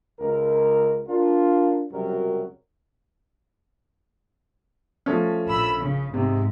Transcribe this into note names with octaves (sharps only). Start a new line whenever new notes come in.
C#2 A#4
D4 F4 A#4
C#2 F#2 C3 F#3 G3 A#4
F3 A3 C#4
A#1 B5 E6
C#3
G#2 C3